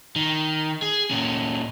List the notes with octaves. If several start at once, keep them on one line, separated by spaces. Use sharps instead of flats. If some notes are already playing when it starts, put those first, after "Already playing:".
D#3
G#4
A#2 C#4